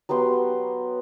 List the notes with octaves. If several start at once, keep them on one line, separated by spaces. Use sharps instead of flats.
F#3 B3 G4 C6